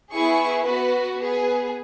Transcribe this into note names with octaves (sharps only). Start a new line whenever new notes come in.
B3 E4 G#4 C#6
B3 F#4 B4
B3 G#4 B4